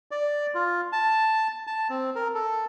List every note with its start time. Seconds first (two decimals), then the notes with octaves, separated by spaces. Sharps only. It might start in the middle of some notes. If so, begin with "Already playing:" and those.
0.11 D5
0.55 F4
0.92 A5
1.67 A5
1.90 C4
2.15 A#4
2.34 A4